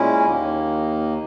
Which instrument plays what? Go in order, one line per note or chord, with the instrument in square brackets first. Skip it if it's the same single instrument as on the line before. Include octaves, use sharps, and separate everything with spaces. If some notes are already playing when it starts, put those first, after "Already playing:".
Already playing: [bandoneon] A#2 G#3 C#4 E4
D#2 D#3 A#3